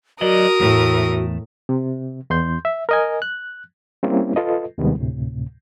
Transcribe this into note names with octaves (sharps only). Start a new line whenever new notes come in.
F#3 F#4 A#4 D5 D#5 D#6
E2 A2 A3
C3
E2 C6 G6
E5
A#4 D#5 G#5
F#6
G3 A#3 C4 C#4 E4
F4 A4 B4 D#5
D#2 C3 D#3 G3 G#3 B3
D2 A2 C3